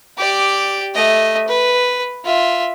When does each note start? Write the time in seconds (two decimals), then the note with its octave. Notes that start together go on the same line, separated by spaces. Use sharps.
0.17 G4 D5
0.94 A3 D#5
1.48 B4
2.24 F4 E5